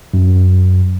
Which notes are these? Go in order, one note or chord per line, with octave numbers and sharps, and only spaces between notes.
F#2